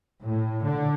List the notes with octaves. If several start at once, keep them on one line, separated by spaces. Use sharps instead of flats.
A2
D3